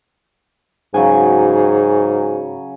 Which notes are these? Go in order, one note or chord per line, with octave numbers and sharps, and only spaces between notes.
G#2 C#3 F#3 G#5